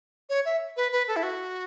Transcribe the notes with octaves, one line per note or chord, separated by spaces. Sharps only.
C#5
E5
B4
B4
A4
E4
F#4